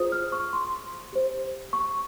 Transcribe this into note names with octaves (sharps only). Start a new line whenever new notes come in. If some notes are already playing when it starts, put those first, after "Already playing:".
Already playing: F4 G#4 C5 D#6
F6
C#6
C6
G4 C5
C#6